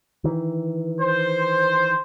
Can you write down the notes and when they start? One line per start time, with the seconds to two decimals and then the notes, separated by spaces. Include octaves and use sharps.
0.24 D#3 E3
1.00 C5